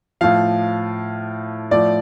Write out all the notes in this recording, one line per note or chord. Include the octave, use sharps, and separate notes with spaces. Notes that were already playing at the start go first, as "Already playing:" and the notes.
A2 F3 F5
A2 F3 D5